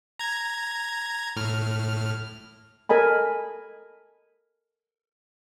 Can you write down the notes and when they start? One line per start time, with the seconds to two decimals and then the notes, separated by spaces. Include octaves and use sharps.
0.19 A#5 G#6
1.36 A2 F6
2.89 A4 A#4 D#5 G#5 B5